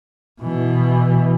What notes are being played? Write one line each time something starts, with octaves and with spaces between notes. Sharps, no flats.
B2 E3